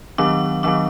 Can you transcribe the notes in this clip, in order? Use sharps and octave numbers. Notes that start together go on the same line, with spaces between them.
D#3 F#3 B3 D4 D6
D#3 F#3 B3 D4 D6